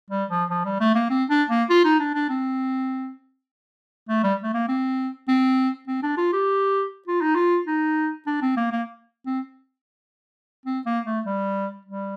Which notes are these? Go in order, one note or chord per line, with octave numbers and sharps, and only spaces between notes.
G3
F3
F3
G3
A3
A#3
C4
D4
A#3
F4
D#4
D4
D4
C4
A3
G3
A3
A#3
C4
C4
C4
D4
F4
G4
F4
D#4
F4
D#4
D4
C4
A#3
A#3
C4
C4
A#3
A3
G3
G3